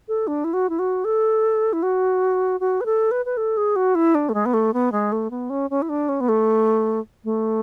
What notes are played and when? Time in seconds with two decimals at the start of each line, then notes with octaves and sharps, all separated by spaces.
0.08 A4
0.27 D4
0.44 E4
0.53 F#4
0.69 E4
0.79 F#4
1.05 A4
1.73 E4
1.83 F#4
2.60 F#4
2.81 B4
2.86 A4
3.11 B4
3.25 B4
3.37 A4
3.57 G#4
3.76 F#4
3.95 E4
4.15 D4
4.29 A3
4.34 G#3
4.46 B3
4.54 A3
4.73 B3
4.92 G#3
5.12 A3
5.30 B3
5.50 C#4
5.70 C#4
5.82 E4
5.89 D4
6.09 C#4
6.20 B3
6.28 A3
7.24 A3